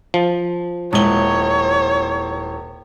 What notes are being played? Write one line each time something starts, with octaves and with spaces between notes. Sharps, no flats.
F3
D#1 G#3 B3 E4 C#5 G7